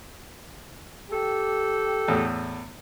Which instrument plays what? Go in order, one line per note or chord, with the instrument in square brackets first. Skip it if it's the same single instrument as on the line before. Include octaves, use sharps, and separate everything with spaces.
[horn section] G4 A4 G5
[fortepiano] E2 A2